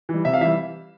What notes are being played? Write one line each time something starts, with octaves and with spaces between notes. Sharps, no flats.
E3 G3
C3 E5
F5
E3 G3 E5